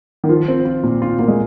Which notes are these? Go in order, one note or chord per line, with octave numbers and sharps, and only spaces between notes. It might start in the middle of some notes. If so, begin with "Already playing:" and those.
D#3
F3 F4
C4
F4
A#2
F4
A#3 F4
G#3